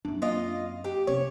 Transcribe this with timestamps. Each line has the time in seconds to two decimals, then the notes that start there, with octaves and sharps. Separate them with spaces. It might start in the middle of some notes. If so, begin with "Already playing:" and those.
0.05 F#2 C4 D4
0.22 A#3 F4 D#5
0.84 G4
1.07 C3 C#4 C#5